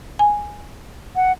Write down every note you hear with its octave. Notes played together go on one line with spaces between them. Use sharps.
G#5
F#5